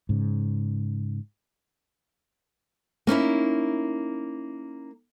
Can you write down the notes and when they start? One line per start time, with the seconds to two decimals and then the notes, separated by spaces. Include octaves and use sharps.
0.09 G#2 C#3
3.07 A#3 C#4 D#4 E4